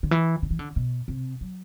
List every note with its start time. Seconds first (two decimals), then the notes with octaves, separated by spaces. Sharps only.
0.03 D3
0.11 E3
0.43 D3
0.51 E3
0.59 D3
0.76 B2
1.08 C3
1.41 F#3